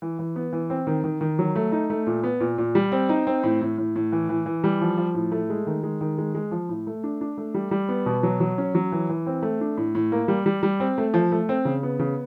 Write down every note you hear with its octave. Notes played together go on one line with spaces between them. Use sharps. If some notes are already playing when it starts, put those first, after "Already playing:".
E3
E3
B3
E3
C4
D#3
D#3
D#3
F#3
A3
D#4
A3
A#2
B3
A#2
A#2
G3
C4
D#4
C4
A2
A2
A2
A2
E3
E3
E3
G3
F3
F3
A2
A3
G#3
D#3
G#3
D#3
G#3
G#3
F3
A2
A3
D4
D4
A3
G3
G3
B3
B2
F#3
F#3
C#4
F#3
E3
E3
C4
A3
D4
A2
A2
A#3
G3
G3
G3
C4
A3
F3
A3
C4
C#3
B3
C#3